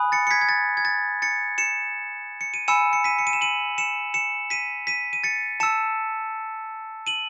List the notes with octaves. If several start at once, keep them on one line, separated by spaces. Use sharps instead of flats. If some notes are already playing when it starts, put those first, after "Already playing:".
Already playing: G#5 B5 D#6 F#6
A6 C#7
C#7
G#6 B6
G#6
A6
G#6
A6
A6 C#7
C#7 E7
C#7
D#7
G#5 B5 E6 C#7 E7
C#7
B6 D#7
C#7
D#7
E7
D#7 F#7
C#7 E7
C#7 E7
B6 D#7
B6 D#7
D#7
A6 C#7
A5 E6 C#7 E7
D#7 F#7